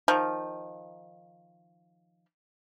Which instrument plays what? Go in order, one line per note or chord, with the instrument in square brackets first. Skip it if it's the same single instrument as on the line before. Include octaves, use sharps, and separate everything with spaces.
[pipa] D#3 F3